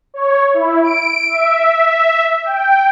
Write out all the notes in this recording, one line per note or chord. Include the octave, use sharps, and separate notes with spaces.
C#5
E4
D7
E5
E5
G5